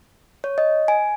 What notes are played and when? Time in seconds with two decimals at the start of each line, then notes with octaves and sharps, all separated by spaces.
0.44 C#5
0.58 D#5
0.88 G#5